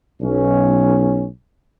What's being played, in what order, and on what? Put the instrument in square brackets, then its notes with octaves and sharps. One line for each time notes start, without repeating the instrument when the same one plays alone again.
[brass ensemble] B1 C#4